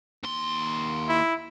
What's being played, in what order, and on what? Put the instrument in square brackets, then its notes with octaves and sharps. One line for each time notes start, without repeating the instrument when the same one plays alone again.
[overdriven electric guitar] D#2 C6
[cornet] E4